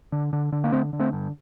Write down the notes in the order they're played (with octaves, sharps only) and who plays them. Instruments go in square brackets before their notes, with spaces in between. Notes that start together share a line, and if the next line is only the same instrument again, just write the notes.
[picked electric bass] D3
D3
D3
A#3
D3 A3 C4
D3
A3 C4
G2